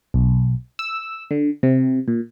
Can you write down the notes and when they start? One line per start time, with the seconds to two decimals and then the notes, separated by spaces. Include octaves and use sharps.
0.14 B1
0.79 E6
1.31 D3
1.63 C3
2.08 A#2